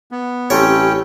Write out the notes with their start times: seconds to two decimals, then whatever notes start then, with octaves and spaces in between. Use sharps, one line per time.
0.11 B3
0.50 A1 G3 A3 C4 C#4 C#5 G5